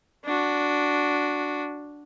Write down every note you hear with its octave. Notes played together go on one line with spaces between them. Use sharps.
D4 F#4